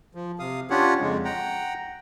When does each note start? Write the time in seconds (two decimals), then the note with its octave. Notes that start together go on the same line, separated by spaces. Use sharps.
0.15 F3
0.39 C3 F5 D#6
0.70 C#4 D4 F4 G4 C#5 F#5
1.00 F2 C#3 G#3
1.25 F#5 G5 A#5